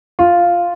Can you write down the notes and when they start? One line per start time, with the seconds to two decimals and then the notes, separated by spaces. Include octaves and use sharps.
0.19 F4